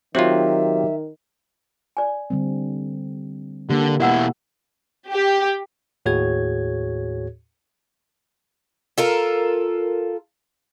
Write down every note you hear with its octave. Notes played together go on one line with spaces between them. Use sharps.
D#3 F#3 C4 F4 G4 E5
D5 G#5
D3 G3 C4
D3 A#3 G4
B2 E4 D#5 F#5 E6
G4
D#2 A2 F#4 G#4 C#5 G#6
F4 A4 A#4